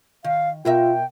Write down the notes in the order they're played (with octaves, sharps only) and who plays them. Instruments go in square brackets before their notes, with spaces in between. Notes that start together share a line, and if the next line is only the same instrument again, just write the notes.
[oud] D#3 [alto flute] F5
[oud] B2 A#4 E5 [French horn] F4 [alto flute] G5